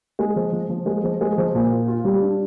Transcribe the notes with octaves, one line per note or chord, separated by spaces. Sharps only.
G#3
F3
F3
F3
G#3
F3
G#3
F3
A#2
F4
F4
G3
D4